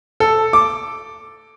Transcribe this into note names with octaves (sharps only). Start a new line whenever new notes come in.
A4
D6